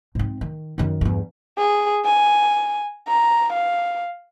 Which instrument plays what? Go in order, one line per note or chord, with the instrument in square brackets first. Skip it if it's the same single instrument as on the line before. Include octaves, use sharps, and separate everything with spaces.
[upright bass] G#2 C4
D#3
F#2 D#3
E2 G2
[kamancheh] G#4
G#5
A#5
F5